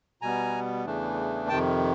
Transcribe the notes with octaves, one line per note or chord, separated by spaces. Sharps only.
B2 G3 B3 G#5 A#5
E2 C#3 E3 A3 D4
F2 C3 D#3 G5 A5